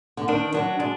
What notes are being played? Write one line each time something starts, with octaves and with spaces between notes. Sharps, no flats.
D3
D#3 D4
F#3 D4
G#3 D4